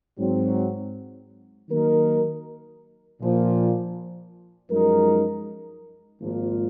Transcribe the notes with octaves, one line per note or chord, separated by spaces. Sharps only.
G#2 F#3 C4
D#3 F#3 A#3 D#4 A#4
A#1 A#2 F3
F#2 F3 G#3 D#4 A#4
G#1 G#2 F3 A#3 F4